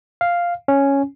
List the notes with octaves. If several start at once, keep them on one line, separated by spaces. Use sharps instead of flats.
F5
C#4